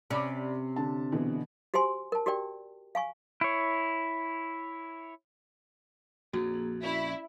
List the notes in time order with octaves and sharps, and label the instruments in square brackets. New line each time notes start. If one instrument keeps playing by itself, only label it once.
[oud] C3 C#4 [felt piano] D5 B5 D6
[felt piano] D3 A5
B2 D3 E3
[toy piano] F#4 G4 C5 G#5 C6
A#4 A5
F#4 G4 A#4 D5 G5
F5 G#5 C#6
[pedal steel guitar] E4 C#5
[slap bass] A#1 F2 [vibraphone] A#3 G#4 [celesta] F#4
[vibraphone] C#4 D5 B5 [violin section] E4